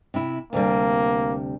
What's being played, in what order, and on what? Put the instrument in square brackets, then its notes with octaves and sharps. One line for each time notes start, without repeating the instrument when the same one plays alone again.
[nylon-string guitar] C3 E4
[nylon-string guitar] D2 C3 G3 [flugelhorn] A#3